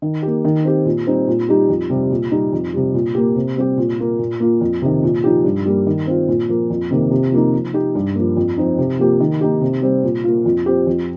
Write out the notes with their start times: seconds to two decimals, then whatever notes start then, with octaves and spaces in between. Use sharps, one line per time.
0.02 D#3
0.23 A#3 G4
0.45 D#3
0.65 C4 G4
0.86 A#2
1.07 G3 C4 D#4
1.28 A#2
1.49 G3 D#4 G4
1.69 F2
1.90 C3 G3
2.11 A#2
2.31 G3 D#4
2.53 F2
2.73 C3 G3
2.94 A#2
3.15 A#3 G4
3.36 C3
3.57 G3 C4 G4
3.78 A#2
3.99 A#3 F4
4.19 A#2
4.40 A#3 F4
4.61 F2
4.82 C3 D#3
5.03 A#2
5.24 F3 D#4 G4
5.44 G2
5.66 G3 A#3
5.87 D#3
6.07 C4 F4
6.28 A#2
6.49 F3 A#3
6.70 F2
6.91 C3 D#3 A#3
7.11 C3
7.32 F3 A#3 D#4
7.53 F3
7.74 D#4 G4
7.95 G2
8.15 F3 A#3
8.37 F2
8.58 F3 C4 D#4
8.78 C3
8.99 F3 A#3 G4
9.20 D#3
9.41 A#3 D#4 G4
9.61 C3
9.82 G3 C4
10.04 A#2
10.24 A#3 F4
10.45 F2
10.66 F3 C4 G4
10.87 F2